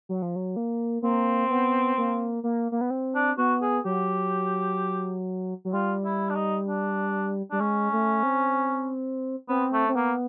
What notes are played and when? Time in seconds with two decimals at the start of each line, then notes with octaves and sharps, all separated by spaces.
0.09 F#3
0.22 F3
0.36 F#3
0.56 A#3
1.02 A#3 C4
1.50 B3
1.98 A#3
2.44 A#3
2.72 A#3
2.81 B3
2.90 C4
3.15 D4
3.38 B3 F#4
3.62 G#4
3.85 F#3 G4
5.65 F#3
5.73 G3 F4
6.05 E4
6.29 D4
6.35 D#4
6.67 D4
7.51 G3 D4
7.60 G#3 C#4
7.93 A3
8.23 C4
9.48 B3 C4
9.73 A3
9.88 C4
9.95 A#3 B3